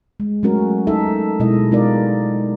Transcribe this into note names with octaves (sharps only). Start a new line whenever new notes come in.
G#3
F#3 G#3 A3 C#4 F#4 A#4
D#4 A4 E5
B2 G#3 E4 D#5
G#3 B3 D#4 F4 A#4 D5